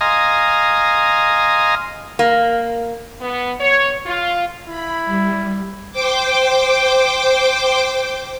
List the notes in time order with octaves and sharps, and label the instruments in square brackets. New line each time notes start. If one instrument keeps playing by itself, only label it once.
[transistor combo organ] D#5 F5 G#5 A#5 C6 D#6
[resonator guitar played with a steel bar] A#3
[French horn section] B3
C#5
F4
[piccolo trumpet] E4 [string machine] B5
[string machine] G3
C5 G5 D6